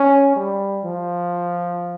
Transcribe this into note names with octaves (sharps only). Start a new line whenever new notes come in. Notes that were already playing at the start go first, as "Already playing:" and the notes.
Already playing: C#4
G3
F3